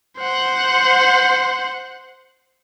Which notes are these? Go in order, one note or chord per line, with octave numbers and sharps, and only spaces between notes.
C5 F#5